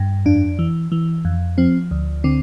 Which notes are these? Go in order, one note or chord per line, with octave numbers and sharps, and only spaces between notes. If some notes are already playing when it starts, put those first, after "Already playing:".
Already playing: G2
F2 D4
E3
E3
F2
F3 C4
D2
D3 C4